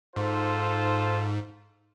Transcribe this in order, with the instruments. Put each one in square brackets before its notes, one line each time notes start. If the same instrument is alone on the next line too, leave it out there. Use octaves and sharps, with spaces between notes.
[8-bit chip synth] G#2 [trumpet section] F4 A4 C5